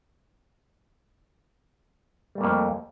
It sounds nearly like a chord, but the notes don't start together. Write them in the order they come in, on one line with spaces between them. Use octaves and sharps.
G3 A3 A#3 F2